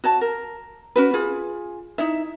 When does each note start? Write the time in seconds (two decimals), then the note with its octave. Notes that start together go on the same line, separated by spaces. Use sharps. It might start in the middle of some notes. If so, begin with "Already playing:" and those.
0.04 F#4 C#5 A5
0.21 A#4
0.96 C#4 F#4 B4
1.14 F4 G#4
1.98 D#4 E4 E5